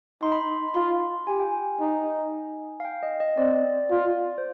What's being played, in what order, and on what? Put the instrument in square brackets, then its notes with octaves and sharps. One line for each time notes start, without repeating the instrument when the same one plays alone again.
[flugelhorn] D#4 [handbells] C6
[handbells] B5
C6
B5
[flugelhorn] F4 [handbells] C6
[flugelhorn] G4 [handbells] G#5
[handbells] G5
G#5
[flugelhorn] D#4
[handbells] F5
G5
D#5
D#5
[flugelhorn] C4 [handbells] D5
[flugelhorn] F4
[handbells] C5